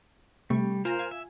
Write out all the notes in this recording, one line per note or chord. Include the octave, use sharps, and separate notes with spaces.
C3 G3 A3 C#6
F4 A#4 C5 G#5 A#5
F5 G#5 G#6
E5